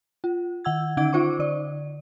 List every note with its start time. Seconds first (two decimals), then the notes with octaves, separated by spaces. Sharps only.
0.24 F4
0.65 D#3 F#5 E6 G#6
0.97 D3 C#4 D#4 F#5 G#6 D7
1.13 D#4 F4 C5 C#6 D6
1.39 D3 D5